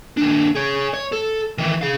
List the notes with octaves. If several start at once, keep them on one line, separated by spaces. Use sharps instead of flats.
D#2 D4
G#4 C#5
C#5
A4
D#3 E3
G#4 F5